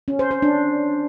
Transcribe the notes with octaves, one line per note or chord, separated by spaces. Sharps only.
C#4
C5
C5
D4